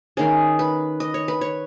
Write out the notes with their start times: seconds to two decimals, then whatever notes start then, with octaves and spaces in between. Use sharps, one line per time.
0.17 D#3 A#3 C#4 G#4
0.59 B4
1.00 D#5
1.14 C#5
1.28 B4
1.41 C#5